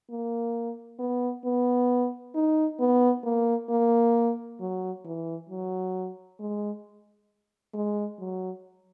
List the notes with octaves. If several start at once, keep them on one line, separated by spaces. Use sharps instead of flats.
A#3
B3
B3
D#4
B3
A#3
A#3
F#3
E3
F#3
G#3
G#3
F#3